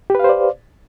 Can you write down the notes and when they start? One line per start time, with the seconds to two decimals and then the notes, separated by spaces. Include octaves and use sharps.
0.10 G4
0.15 B4
0.20 F5
0.24 C5
0.29 D5